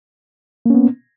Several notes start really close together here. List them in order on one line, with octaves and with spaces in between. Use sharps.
A#3 C#4 B3